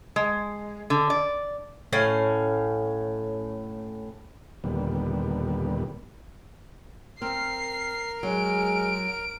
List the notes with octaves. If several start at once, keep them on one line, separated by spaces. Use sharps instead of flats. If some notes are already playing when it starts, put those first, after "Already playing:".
G#3
D3
D5
A2 C#4 F5
D#2 A#2 D3 G3 B3
C4 A#4 F6 C7
F#3 G#3 D7